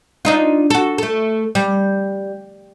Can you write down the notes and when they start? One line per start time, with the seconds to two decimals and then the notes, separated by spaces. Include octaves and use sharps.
0.25 D4 D#4 F4
0.70 F#4 A4
0.98 A3 A4
1.55 G3